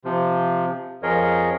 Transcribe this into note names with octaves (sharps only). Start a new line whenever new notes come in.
C3 F3
F2 F3 G#4 A#4 C#5 D#5